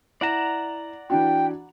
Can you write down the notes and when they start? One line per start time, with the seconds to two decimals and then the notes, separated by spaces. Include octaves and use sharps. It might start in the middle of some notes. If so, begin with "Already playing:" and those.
0.21 E4 D5 F#5 A#5 E7
1.10 E3 D4 F#4 G5